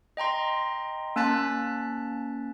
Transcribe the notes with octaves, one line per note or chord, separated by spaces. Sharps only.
D#5 G5 A#5 C6
A#3 C#4 A5 F#6 A6 B6